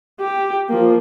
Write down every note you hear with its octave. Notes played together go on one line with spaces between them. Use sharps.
G4
F3 A#3